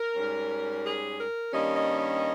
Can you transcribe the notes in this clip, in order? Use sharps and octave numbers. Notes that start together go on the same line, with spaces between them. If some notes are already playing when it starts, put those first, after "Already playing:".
Already playing: A#4
G#2 G3 C#4
G#4
A#4
G2 D#3 G3 A#3 C#4 D#5
D#5
D#5